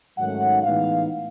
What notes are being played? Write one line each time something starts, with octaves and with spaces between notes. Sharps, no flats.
G#2 D#3 F#3 A3 C#4 F#5
A2 E3 G#3 B3 D#4 F5